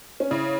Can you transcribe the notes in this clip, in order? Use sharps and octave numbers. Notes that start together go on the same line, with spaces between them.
C#4
C#3 E4